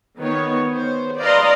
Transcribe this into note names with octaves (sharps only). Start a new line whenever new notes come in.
D#3 B3 C#5
C5
B4 D5 D#5 F5 A#5 C6